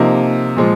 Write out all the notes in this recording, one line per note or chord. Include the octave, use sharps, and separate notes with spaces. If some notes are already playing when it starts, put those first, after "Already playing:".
Already playing: C3 F3 A#3 D#4
A#2 F3 G#3